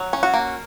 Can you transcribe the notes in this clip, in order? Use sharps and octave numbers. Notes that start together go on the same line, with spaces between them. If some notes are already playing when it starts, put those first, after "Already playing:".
Already playing: F#3
C#4
F#4
A#3